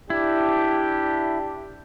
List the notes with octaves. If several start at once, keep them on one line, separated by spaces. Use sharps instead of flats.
D4 E4 G4